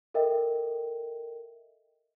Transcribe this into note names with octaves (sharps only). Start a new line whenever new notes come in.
A4 A#4 D#5 E5 G5